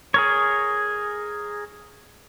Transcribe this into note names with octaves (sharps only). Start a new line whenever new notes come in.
G#4 A#4 C#5